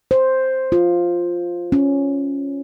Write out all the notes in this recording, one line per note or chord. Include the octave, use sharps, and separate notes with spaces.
C5
F4
C#4